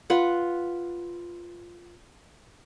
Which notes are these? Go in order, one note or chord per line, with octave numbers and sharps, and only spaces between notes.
F4 B4 F#5